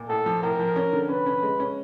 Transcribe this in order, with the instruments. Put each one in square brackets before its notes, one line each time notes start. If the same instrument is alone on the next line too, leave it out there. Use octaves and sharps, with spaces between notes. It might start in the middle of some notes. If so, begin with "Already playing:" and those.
Already playing: [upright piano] A#2
[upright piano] A2 [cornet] A4
[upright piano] F3
[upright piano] A2 [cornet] A#4
[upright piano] F3
C#4
D3
[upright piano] C#4 [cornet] B4
[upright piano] C#4
G#3
C#4